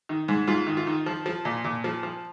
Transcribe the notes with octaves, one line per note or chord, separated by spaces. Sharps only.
D#3
G#2
G#2 F4
D#3
F4
D#3
F3
F3
A#2
A#2
F3
F3